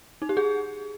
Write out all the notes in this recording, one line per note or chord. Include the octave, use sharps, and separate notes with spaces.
D#4
G4
G#4